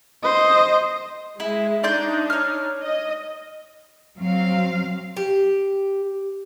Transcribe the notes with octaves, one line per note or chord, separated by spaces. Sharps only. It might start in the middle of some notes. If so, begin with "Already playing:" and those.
C5 D#5
G#3 E4
D4 D#4 D5 C6 G6
C#5 F6
D#5
F#3 C4 F5
G4